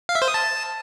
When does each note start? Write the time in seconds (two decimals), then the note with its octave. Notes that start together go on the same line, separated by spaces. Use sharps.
0.09 F5
0.15 E5
0.22 C5
0.28 D#6
0.34 A5